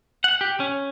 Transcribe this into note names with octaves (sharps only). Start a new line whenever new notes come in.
F#5
G4
C#4